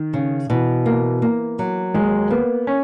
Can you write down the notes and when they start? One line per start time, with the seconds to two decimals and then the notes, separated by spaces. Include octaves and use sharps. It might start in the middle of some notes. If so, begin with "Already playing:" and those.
Already playing: D#3
0.14 C#3
0.49 B2 E3
0.86 A#3
1.22 A#3
1.59 F#3
1.94 D#2 G#3
2.30 A#3 B3
2.67 C#4